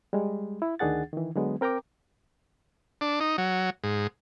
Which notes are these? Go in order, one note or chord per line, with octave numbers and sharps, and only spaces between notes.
G3 G#3
E4
D2 D#3 D4 G#4 F#5 A6
D#3 E3
D3 F#3 G#3 B3
C4 A#4 G5 A#5 D6
D4
D#4
F#3
G#2